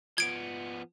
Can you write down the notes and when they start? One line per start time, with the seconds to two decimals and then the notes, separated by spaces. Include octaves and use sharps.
0.18 F3 B3 G#6 D7